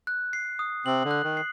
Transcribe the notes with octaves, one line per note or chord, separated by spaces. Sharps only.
F#6
C7
D#6
C3 C4 F#7
D3
F#6
D#3
C7